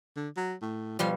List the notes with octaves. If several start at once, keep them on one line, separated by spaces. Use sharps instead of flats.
D3
F#3
A2
B2 F3 G3 F4